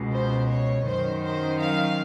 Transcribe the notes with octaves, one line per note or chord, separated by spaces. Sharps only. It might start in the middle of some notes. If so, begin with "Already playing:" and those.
Already playing: C#2 B2
C5
C#5
F#2 D#3 C5
C5
F5